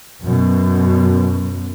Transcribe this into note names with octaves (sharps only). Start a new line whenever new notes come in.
F#2 B2